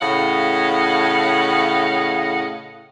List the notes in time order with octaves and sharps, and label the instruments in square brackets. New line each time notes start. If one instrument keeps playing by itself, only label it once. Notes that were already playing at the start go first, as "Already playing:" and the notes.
[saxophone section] A2 C#3 D#5 F5 F#5